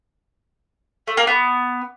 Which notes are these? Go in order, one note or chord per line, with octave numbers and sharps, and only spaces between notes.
A3
A#3
B3